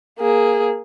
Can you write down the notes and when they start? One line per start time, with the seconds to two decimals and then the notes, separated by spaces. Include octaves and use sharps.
0.19 A#3 G#4